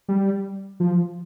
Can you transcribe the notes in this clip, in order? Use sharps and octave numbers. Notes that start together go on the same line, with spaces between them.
G3
F3